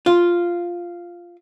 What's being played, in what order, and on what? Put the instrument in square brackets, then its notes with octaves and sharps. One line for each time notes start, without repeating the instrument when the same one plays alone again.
[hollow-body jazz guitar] F4